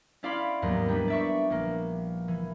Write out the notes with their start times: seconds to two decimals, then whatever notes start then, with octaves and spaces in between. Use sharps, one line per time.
0.23 C#4 E4 D5 F5 B5 C6
0.62 D#2 G#2 F#3 B3
0.89 G3 D4 B4
1.08 D5 E5 C#6
1.50 A#1 A#3
2.28 E3